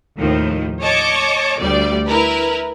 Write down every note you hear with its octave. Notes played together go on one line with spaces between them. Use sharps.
D#2 A2 D#3 F3
C#5 D#5 A5 C#6 D6
D2 G3 D5
E4 A#4 B4